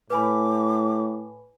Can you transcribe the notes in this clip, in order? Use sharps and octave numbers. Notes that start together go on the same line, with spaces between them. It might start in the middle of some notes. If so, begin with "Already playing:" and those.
A2 B4 G#5 B5 D6